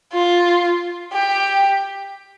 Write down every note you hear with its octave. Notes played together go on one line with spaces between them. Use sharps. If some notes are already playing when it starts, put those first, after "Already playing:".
F4
G4